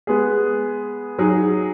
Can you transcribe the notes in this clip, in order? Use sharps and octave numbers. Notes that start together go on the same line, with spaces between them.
G#3 B3 G#4
F#3 D#4 G#4